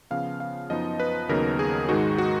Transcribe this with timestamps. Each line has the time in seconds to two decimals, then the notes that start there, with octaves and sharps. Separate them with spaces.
0.11 C#3 F3 B3 F5
0.40 F5
0.70 F#2 F3 B3 D#4 D#5
1.00 B4
1.29 D#2 C#3 F#3 B3 D#4 A#4
1.59 G#4
1.88 G#2 D#3 G#3 D#4 F#4
2.18 F#4